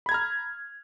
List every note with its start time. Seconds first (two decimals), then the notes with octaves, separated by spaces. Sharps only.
0.06 B5
0.09 G#6
0.12 A#5
0.14 F6